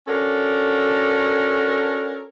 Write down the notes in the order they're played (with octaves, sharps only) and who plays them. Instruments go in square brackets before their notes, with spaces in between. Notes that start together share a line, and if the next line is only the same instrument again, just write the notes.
[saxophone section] C#4 D4 F#4 A4 A#4